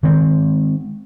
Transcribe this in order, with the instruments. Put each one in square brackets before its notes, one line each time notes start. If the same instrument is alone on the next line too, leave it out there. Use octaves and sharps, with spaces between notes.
[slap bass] D#3 G#3 C4